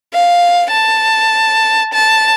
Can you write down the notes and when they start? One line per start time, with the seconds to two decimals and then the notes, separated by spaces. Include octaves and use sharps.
0.14 F5
0.71 A5
1.94 A5